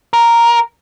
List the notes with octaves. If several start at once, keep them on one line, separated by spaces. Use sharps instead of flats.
A#4